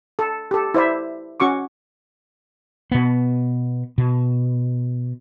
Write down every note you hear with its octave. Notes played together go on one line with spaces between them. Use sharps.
A4
G4 A4
E4 C5 D5 E5
C#4 F#4 C#6 D6
B2 B3
B2